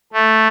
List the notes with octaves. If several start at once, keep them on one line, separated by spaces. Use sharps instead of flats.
A3